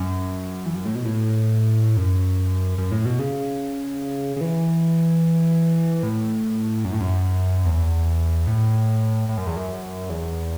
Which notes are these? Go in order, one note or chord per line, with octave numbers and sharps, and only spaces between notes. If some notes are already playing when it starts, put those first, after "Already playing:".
Already playing: F#2
E2
F#2
A2
B2
A2
F#2
F#2
A2
B2
C#3
C#3
E3
A2
F#2
A2
F#2
E2
A2
A2
F#2
E2
F#2
E2